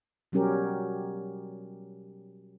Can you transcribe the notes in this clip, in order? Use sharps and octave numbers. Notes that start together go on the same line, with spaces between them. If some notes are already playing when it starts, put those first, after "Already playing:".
B2 F#3 G3 C#4 G4 A#4